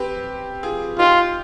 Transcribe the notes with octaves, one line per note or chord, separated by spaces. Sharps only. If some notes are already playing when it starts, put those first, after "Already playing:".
Already playing: C4 G4 B4
F4 G#4
D#4 F4 G4